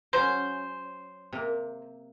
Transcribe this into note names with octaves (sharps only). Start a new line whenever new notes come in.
F#3 C#4 C5
C3 A#3